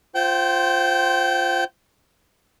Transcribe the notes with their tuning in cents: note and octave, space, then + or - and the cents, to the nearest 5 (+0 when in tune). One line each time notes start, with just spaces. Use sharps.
F4 +0 C5 +0 G5 -30